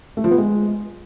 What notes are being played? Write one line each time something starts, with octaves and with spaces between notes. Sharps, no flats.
A3
F3
B3
G#3